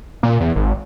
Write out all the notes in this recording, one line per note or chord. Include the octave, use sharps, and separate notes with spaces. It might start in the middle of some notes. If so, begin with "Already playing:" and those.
A#2
E2
G#1